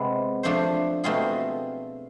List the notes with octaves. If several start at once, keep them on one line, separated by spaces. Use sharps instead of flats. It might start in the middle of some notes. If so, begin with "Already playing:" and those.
Already playing: C3 G#3 B3
F3 A3 D4 A4 C5
B2 A3 C4 F4 G#4